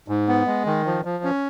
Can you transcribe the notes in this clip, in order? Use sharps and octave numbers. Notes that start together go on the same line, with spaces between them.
G#2
B3
G#3
D#3
F3
F3
C#4